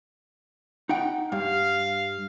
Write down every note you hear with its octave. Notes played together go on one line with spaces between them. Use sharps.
D#4 F#5 G5
G2 F5